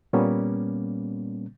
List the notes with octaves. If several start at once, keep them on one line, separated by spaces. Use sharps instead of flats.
A#2 G3 A#3 B3 C#4